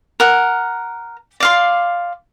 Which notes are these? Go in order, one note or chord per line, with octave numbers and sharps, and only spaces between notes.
A#4 F#5
D5 F5 C6